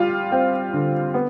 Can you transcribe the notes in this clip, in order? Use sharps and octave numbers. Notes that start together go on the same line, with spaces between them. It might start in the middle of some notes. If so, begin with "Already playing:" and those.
Already playing: G3 F4
C4
D3
B3